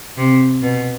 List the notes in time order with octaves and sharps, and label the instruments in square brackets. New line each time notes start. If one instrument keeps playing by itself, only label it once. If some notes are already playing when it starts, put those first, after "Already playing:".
[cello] C3
B2